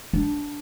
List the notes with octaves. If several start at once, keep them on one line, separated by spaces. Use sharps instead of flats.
D4